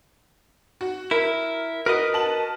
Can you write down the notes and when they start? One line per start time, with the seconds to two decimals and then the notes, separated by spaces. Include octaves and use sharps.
0.81 F#4
1.11 E4 A#4
1.86 F#4 A#4 B4 D#5
2.13 F#4 A5 F#7